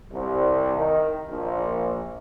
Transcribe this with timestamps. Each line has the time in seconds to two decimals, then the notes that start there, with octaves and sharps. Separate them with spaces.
0.12 C2
0.77 D#3
1.29 A#1